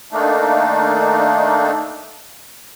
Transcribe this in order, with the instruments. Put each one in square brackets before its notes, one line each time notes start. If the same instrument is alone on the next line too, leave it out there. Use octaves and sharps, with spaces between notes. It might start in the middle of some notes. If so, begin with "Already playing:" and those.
[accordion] D#3 A3 A#3 D4 D#4